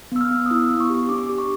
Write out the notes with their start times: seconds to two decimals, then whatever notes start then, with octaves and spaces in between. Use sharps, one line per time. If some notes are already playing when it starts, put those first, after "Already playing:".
0.12 B3 E6
0.21 F6
0.31 B3
0.46 D#6
0.51 E4 E6
0.70 B3
0.80 C#6
0.90 G4
1.09 D4 D6
1.29 G4
1.38 C#6